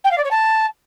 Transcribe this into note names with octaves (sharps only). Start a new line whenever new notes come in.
G5
F5
D5
C#5
A5